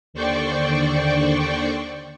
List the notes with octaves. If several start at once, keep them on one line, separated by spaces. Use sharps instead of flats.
D#2 D3 C5 D5 G5 C#6